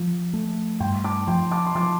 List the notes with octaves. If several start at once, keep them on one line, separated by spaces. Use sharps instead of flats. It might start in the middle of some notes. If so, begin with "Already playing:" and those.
Already playing: F3
A3
G2 G5 C6
A5 D6
F3 G5 C6
A5 D6
C6
F3 A5 D6